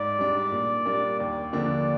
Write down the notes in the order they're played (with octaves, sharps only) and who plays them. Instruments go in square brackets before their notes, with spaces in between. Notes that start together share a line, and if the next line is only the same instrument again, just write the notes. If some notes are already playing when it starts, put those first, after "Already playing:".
Already playing: [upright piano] G#2 [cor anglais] D5
[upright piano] G3 D4
A#2
G3 A#3 D4
[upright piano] D#2 [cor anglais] D5
[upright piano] D3 F3 A#3 D4